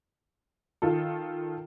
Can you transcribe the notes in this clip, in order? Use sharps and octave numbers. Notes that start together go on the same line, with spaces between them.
D#3 F4 A4